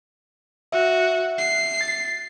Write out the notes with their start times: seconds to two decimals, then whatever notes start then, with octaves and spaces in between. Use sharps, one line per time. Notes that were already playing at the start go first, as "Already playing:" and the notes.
0.72 F#4 E5
1.38 C7
1.81 A6